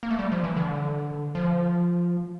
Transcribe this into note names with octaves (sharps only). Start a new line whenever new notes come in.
A#3
A3
G3
F3
E3
D3
F3